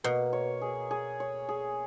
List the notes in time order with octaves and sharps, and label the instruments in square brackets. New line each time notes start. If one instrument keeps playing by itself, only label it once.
[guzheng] B2 [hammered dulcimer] A#3
[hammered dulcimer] C#5
G#4
G#4
C#5
G#4